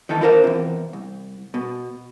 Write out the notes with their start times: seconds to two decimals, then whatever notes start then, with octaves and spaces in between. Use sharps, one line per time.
0.09 D#3 E3 D#4 A4
0.21 E4 F4 A#4 C5 F5
0.44 E2 C3
0.93 C2
1.54 B2